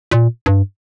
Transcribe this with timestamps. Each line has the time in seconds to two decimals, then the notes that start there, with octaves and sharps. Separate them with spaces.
0.11 A#2
0.46 G2